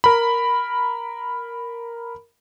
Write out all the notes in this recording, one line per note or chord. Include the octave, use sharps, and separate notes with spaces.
A#4 B5